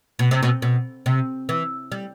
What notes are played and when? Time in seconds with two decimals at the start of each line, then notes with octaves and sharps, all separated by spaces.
0.19 B2
0.31 C3
0.43 B2
0.62 B2
1.06 C3
1.49 E3
1.92 G3